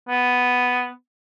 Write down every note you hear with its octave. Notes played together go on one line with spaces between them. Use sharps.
B3